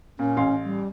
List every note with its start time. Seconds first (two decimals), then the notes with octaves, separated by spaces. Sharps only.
0.19 A#2 C#4
0.37 A1 F5 C6
0.65 G3